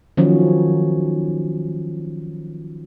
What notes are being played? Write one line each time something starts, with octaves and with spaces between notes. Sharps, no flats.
D#3 F3 F#3 C#4